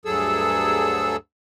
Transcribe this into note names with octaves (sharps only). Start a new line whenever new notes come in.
D2 G2 F#3 G#4 A4 E6